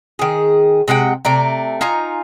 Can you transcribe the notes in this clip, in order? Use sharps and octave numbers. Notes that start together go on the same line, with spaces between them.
D#3 G#4
C3 G#3 F#5 G5
C3 A3 D5 A#5
D#4 F4 G#5 A#5